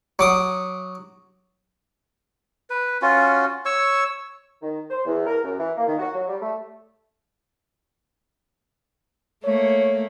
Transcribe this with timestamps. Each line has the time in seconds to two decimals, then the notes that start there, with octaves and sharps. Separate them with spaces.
0.19 F#3 D6 D#6
2.70 B4
3.02 C#4 F4 F#4
3.65 C#5 C#6 E6
4.62 D#3
4.90 C5
5.06 E2
5.26 A#4
5.44 F#2
5.58 E3
5.76 A#3
5.87 D#3
5.99 F#4
6.14 F#3
6.28 G3
6.41 A3
9.44 A3 A#3 C#5